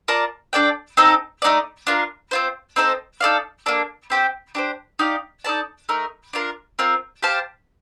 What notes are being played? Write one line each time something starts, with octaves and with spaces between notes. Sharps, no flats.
F4 A#4 D5 A5
D4 A4 D5 G5
C4 D#4 A4 D#5
A3 D#4 A4 D5
D4 F4 A#4
C4 F4 C5
C4 D#4 A4 C5
D#4 A4 D5 F5
A#3 D4 A4
C4 G4 C5 G5
D4 G4 C5
D#4 G4 D5 F5
D#4 A4 D5 A5
A3 D#4 A#4
D4 F4 A#4
C4 F4 A#4
G4 C5 F5 A5